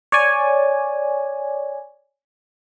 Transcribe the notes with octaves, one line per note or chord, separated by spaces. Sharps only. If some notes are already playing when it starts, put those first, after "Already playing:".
C#5 D5 G#5